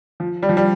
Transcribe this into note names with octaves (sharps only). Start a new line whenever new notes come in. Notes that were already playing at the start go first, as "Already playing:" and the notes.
F3
G3
F3
G3